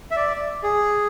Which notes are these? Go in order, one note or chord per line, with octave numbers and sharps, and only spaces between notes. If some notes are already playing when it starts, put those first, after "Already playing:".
E5
D5
G#4